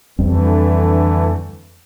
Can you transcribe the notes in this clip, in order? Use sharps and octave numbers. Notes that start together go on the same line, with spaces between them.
F2 D3 E3 G3 A3 C4